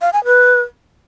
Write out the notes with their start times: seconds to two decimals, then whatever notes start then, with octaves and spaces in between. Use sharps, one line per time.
0.01 F5
0.13 G#5
0.25 B4